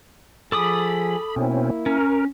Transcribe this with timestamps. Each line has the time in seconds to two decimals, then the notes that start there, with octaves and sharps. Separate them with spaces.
0.52 F3 G#4 A4 B5 D6 D#6
1.36 B2 A#3 C4 C#4 E4
1.86 C#4 A#4